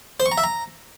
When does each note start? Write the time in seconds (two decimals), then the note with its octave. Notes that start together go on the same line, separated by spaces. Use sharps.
0.20 C5
0.26 C#6
0.32 A#5
0.38 E5
0.44 A#5